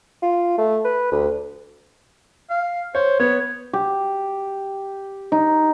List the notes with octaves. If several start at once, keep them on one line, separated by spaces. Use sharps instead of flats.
F4
A3
B4
D2
F5
C5 C#5
B3 C#5
G4
D#4